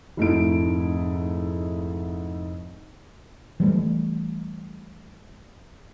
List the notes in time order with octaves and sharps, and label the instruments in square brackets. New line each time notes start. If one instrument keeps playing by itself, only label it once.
[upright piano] F1 G#2 A3 D#4 E4 D7
[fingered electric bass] E3 G3 A3